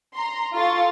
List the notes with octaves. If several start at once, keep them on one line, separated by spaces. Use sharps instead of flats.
A#5 C6
F4 A4 C6 C#6 A6